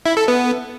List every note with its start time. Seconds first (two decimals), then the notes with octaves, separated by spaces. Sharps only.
0.06 E4
0.17 A4
0.28 B3